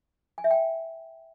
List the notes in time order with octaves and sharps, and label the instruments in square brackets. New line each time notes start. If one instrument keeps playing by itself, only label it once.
[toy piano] G#5
E5
G5